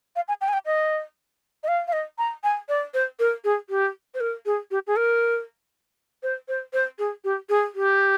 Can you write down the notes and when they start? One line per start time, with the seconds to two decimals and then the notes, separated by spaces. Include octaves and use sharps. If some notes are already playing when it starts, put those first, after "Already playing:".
0.16 F5
0.28 G#5
0.41 G5
0.48 G#5
0.53 G5
0.66 D#5
1.63 D#5
1.68 F5
1.88 F5
1.93 D#5
2.18 A#5
2.44 G#5
2.69 D5
2.94 C5
3.19 A#4
3.44 G#4
3.70 G4
4.14 C5
4.20 A#4
4.46 G#4
4.71 G4
4.87 G#4
4.96 A#4
6.23 C5
6.48 C5
6.73 C5
6.99 G#4
7.24 G4
7.49 G#4
7.75 G4